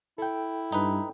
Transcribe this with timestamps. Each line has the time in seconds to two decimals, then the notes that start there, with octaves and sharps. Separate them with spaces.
0.18 E4 A4 G5
0.72 G2 D#4 B4